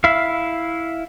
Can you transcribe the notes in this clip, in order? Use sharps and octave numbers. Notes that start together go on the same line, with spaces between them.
E4 E5 F5